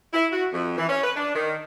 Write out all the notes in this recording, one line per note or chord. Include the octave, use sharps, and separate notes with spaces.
E4
F#4
F2
E3
C#4
B4
D4
D#3